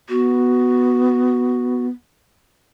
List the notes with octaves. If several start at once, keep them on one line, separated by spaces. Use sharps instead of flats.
B3 F#4